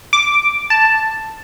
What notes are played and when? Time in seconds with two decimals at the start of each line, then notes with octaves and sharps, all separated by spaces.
0.13 D6
0.70 A5